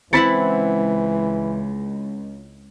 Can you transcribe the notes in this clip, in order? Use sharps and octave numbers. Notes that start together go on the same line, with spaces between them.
C#2 E3 C4 E4 F#5 B5 A6 C#7